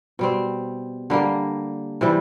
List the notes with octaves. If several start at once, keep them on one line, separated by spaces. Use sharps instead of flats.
B2 G3 C4
D3 G3 A#3
C3 E3 G3